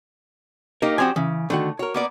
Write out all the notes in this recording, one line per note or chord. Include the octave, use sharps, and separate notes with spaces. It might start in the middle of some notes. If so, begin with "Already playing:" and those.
A#3 D#4 G4 A#4
F3 C4 F#4 G4 D5 G#5
C#3 E3
D3 D#3 A3 F#4
F#4 A#4 C#5
A#3 B3 D5